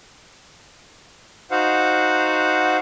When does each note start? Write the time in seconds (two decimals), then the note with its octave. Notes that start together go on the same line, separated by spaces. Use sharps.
1.51 D#4 F#4 C5 F5 F#5